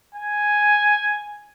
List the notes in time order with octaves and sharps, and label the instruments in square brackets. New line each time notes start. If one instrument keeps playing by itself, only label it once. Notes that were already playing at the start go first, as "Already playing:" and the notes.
[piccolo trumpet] G#5